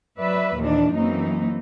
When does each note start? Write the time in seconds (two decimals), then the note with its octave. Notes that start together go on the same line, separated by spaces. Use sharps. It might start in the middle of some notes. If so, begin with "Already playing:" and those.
0.18 F#3 B4 D5 E5
0.59 D#2 A#2 D#3 E3 D4
0.95 F#2 E3 F#3 A#3 C4 D#4